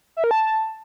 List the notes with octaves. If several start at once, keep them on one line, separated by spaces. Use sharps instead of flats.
E5
A#4
A5